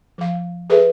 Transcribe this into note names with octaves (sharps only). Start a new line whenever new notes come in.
F3 F5
G#4 A4 B4 E5